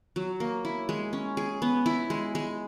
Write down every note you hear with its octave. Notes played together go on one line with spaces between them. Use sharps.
F#3
A#3
E4
G#3
C#4
G#4
B3
E4
G#3
G#3